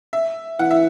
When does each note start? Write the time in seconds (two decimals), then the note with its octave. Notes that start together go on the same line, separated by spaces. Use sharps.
0.13 E5
0.59 E3 F#5
0.71 E5